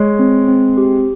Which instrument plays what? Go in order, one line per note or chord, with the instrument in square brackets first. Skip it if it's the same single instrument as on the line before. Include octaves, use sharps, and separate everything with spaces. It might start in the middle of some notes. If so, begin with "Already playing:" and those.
Already playing: [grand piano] G#3 [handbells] C#5
[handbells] C4
C4
G4